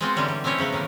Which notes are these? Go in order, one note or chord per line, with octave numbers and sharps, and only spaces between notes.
G#3 B3 C4 F4 F#4 C5
D3 E3 F#3 G3 C#4
G3
A3 C4 C#4 E4 C#5 D#5
C#3 F3 F#3 B3
A2 D#3 E3 A#3